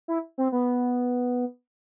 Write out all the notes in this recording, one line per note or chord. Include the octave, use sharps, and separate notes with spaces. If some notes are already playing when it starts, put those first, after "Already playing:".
E4
C4
B3